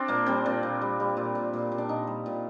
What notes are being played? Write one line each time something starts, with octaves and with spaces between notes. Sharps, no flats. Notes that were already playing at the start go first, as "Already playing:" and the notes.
Already playing: C4 D4 F4
A#2 A#3
G3 C4
A#2 D4
A#2
G3
G3
A#2
A#2
A#2
A#2
D4
A#2 D#4
G3
A#2